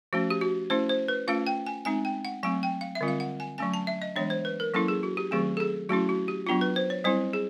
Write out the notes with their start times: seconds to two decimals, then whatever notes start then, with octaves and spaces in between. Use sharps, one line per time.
0.13 F3 A3 C#4 F#4
0.30 G4
0.41 F#4
0.70 A3 C#4 E4 C5
0.89 C5
1.08 B4
1.28 A3 C#4 F4 F5
1.47 G5
1.67 G#5
1.85 G#3 C4 D#4 G#5
2.05 G5
2.25 F#5
2.43 F#3 A3 C4 G#5
2.63 G5
2.81 F5
2.95 E5
3.01 D3 G3 C4 F4
3.08 F5
3.20 F#5
3.40 G#5
3.58 F#3 A3 C#4 G#5
3.74 A5
3.87 E5
4.02 D#5
4.16 E3 G#3 B3 D4 C#5
4.30 C5
4.45 B4
4.60 A#4
4.74 F#3 A#3 C#4 E4 A4
4.88 G#4
5.03 F#4
5.17 G4
5.31 D#3 F#3 A3 C4 G#4
5.57 A4
5.60 G#4
5.89 F#3 A3 C#4 E4 F#4
6.09 F#4
6.28 G4
6.47 F#3 B3 D4 F4
6.61 B4
6.76 C5
6.90 C#5
7.04 G3 C4 E4 C5
7.33 G#4